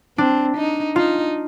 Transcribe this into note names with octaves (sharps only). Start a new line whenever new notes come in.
C4 D4
D#4
D#4 F4